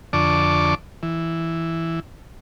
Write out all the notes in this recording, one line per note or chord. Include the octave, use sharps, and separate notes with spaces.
F2 D3 D5 A5 C#6 D6
E3